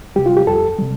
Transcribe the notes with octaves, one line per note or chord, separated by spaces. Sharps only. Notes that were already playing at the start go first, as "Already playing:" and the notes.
C3 G3 G4
F4
G4
F2 A4
C3 G3